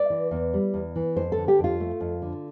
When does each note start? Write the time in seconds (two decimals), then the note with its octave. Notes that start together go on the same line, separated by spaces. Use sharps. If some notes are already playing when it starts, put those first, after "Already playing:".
Already playing: D5
0.10 E3
0.31 E2
0.54 G3
0.74 E2
0.96 E3
1.16 F2 C5
1.32 A4
1.38 D3
1.48 G4
1.59 F2 F4
1.80 A3
2.00 F2
2.22 D3